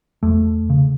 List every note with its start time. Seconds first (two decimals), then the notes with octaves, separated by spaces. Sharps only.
0.23 E2 A3
0.70 C#3